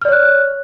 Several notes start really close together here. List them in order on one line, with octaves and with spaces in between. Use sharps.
F6 D5 C#5 F#6